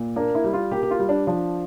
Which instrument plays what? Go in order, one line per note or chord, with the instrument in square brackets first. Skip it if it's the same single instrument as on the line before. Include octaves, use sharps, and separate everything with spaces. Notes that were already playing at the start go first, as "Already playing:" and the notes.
Already playing: [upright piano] A#2
[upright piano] A#3 [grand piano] D4
[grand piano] E4
[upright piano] G3
[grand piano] F4
[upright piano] A#3 [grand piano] G4
[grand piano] G4
F4
[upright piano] G3
[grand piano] D4
[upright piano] F3 [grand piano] D4